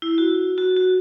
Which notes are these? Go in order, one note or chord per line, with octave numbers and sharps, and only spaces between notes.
E4
F#4
F#4
F#4